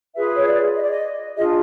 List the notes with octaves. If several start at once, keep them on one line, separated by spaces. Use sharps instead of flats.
F4 G#4 B4 E5
C#5
D5
D#5
D5
D#5
D4 F4 G#4 D#5